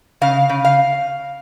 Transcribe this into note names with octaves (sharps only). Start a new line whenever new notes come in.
C#3 F5
C#3
F5